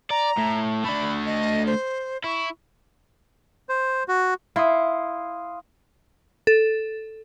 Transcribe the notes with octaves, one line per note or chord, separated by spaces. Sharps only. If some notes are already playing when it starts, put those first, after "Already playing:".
D5 A#5
A2
A3 D4 B5
D#5
C5
E4 C#6
C5
F#4
E4 F5 C6 D#6
A4